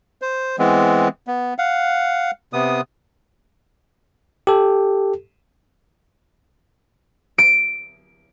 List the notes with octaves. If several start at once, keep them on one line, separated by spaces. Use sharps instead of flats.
C5
E3 G#3 B3 C4
B3
F5 F#5
C3 B3 D#6
G4 A4
D7